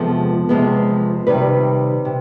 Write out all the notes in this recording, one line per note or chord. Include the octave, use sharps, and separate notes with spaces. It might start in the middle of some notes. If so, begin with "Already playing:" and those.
Already playing: E2 C3 F3 G#3 B3 A4
E2 C3 F3 G#3 B3
C3 D#3 G3 B4
C3